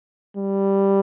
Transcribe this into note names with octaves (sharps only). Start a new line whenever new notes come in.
G3